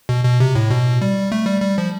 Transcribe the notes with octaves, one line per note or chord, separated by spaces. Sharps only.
B2
B2
C3
A2
B2
G3
A3
G3
G3
F3